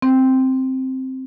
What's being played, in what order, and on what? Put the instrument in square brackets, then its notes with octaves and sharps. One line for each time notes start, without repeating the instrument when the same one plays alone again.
[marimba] C4